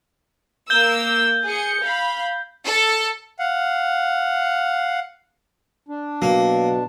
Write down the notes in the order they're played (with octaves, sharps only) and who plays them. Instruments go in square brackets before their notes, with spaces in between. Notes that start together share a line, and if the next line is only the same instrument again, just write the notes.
[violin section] A#3 E6 [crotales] G6 G7
[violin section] G#4 C#7
F5 B5
A4
[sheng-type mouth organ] F5 F#5
[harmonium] D4
[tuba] B2 [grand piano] F#3 [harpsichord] A#3